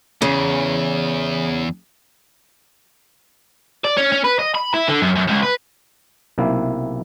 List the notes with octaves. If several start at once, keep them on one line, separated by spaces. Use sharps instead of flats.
E2 C#3
D5
C#4
C#4
B4
D#5
B5
E4
D3
F#2
F#2
C#2
B4
B1 C3 A#3 E4